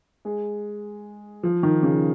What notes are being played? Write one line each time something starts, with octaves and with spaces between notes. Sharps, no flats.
G#3
F3
D#3
C#3